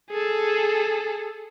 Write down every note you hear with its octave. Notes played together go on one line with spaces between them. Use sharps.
G#4 A4